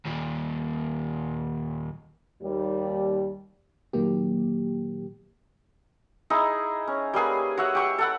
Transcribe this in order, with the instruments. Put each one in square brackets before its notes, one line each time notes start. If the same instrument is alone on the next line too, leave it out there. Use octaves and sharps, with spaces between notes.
[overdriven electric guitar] D#2 A#2
[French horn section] D#2 G3
[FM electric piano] A#2 D#3 F#3 A#3 G4
[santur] D#4 E4 G#4
C#4
G3 A#3 G#4 B4
F#4 C#5 E5 F#5
G4 C#6 E6
A4 F#5 B5